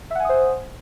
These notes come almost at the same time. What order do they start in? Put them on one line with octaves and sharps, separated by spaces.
E5 F#5 G#5 D#6 C5